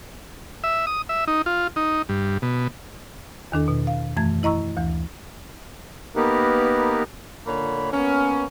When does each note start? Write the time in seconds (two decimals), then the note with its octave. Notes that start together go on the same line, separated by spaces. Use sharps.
0.64 E5
0.87 D#6
1.09 E5
1.28 D#4
1.46 F4
1.76 D#4
2.09 G2
2.42 B2
3.52 E2 D#3 D4 A4
3.68 B2
3.87 F5
4.17 F#2 E3 A3 G#6
4.43 E4 D#5 A#5 C#6 E6
4.77 D2 E3
6.16 A#3 B3 D#4 G4 A#4 B4
7.46 A#2 D3 A#3 C#5 B5
7.93 A#3 B3 C#4